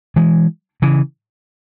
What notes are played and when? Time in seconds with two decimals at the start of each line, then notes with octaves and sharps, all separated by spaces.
0.16 E3 G#3
0.82 C#3 E3